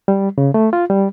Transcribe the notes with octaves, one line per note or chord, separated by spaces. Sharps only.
G3
C#3
A3
F4
G3